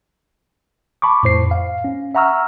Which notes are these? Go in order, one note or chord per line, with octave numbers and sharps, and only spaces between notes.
A5 B5 C#6 D6
F2 A2 C5 C7
F5
C#4
E5 F#5 A#5 C#6 E6 F6